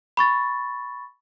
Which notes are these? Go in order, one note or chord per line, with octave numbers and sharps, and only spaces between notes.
B5 C#6 A6